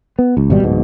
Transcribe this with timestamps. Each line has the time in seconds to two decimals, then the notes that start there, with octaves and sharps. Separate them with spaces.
0.19 B3
0.37 C#2
0.50 G#1 B2 G3
0.63 D1 G#2 B2